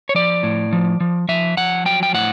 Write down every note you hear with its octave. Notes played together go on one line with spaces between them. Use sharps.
C#5
F3 D5
A2
F3
F3
F3 E5
F3 F#5
F#3 G5
G5
A2 F#5